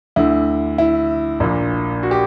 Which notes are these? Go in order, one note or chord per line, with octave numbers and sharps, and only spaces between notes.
D2 D3 E4
E4
A#1 A#2
F#4
G4